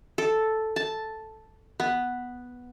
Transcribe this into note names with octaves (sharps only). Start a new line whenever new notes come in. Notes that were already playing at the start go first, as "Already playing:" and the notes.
A4
A5
B3